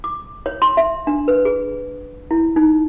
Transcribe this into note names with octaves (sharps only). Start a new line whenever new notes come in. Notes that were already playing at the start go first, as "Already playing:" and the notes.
D6
C#5
C6
E5
D4
B4
G#4
E4
D#4